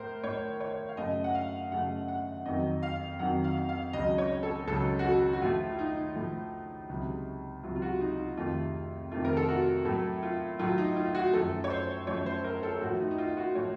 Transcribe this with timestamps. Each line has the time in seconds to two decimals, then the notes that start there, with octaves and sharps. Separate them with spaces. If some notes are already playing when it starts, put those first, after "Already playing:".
Already playing: A2 A3 A#4 C5
0.23 A2 A3 C#5
0.60 C#5
0.89 F5
0.97 F#2 C#3 A3 D#5
1.24 F#5
1.35 F5
1.72 F#2 C#3 A3 F#5
2.08 F#5
2.45 F2 D#3 F#3 D#5
2.83 F5
3.19 F2 D#3 F#3 F#5
3.44 F5
3.69 F5
3.93 C#2 C#3 F#3 D#5
4.18 C#5
4.43 A4
4.67 C#2 C#3 F#3 A4
4.99 F#4
5.05 A4
5.33 F#4
5.41 A2 F3 A3 F4
5.72 F4
5.79 D#4
6.15 A2 F3 A3
6.89 C#2 C3 F#3
7.63 C#2 C3 F#3 F4
7.76 F4
7.82 F#4
8.01 D#4
8.19 F4
8.37 F2 C3 D#3 A3 F4
9.11 F2 C3 D#3 A3 F4
9.25 A#4
9.37 A4
9.48 F#4
9.85 A2 F#3 A3 A4
10.23 F4
10.59 A2 F#3 A3 F4
10.78 D#4
10.96 F4
11.15 F#4
11.33 F#2 F3 A3 A4
11.64 C#5
11.70 C5
12.07 F#2 F3 A3 C#5
12.26 C5
12.44 A#4
12.63 A4
12.74 A4
12.81 A2 F3 A3 F#4
13.00 D#4
13.11 D#4
13.18 F4
13.37 F#4
13.55 A2 F3 A3 C#5